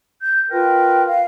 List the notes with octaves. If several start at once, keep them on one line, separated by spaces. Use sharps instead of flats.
G6
F4 A#4 B4 G5
F5